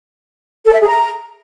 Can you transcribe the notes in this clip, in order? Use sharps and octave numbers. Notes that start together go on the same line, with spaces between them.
A4
E5
G#4
A#5